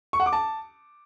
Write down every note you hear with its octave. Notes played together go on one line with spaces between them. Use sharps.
C#6
F#5
D6
A5